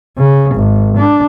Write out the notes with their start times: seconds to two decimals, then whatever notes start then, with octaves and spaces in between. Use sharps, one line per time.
0.18 C#3
0.56 G#1
0.97 D4